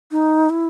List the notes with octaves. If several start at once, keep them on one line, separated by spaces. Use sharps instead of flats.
D#4
E4